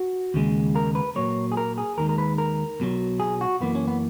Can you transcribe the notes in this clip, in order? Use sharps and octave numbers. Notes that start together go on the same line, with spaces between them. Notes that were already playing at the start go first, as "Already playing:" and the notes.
Already playing: F#4
D#2 C#3 G#3
A#4
B4
A#2 F#3 A#3 C#5
G#4
A#4
G#4
D#2 D#3 G#3 A#4
A#4
B4
A#4
B1 B2 F#3
G#4
F#4
F#2 E3 A#3 B3
C#4
B3